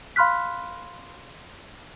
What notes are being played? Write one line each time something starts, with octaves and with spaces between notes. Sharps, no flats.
F5 B5 C6 F6 F#6 B6